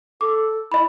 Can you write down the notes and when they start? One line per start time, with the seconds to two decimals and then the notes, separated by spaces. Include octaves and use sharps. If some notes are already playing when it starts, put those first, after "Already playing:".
0.21 A4 D6
0.72 E4 D#5 B5